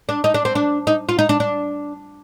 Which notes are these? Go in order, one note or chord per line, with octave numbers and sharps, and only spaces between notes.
D4
D#4
D4
C4
D4
D#4
F4
D#4
D4
D4